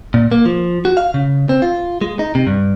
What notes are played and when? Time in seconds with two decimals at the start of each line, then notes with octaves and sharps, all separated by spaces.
0.14 A#2
0.32 A#3
0.45 F3
0.85 F#4
0.97 F5
1.14 C#3
1.49 C4
1.62 F4
2.01 G#3
2.19 D#4
2.35 C3
2.47 G2